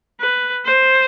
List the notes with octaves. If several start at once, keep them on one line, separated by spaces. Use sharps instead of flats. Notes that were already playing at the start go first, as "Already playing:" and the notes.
B4
C5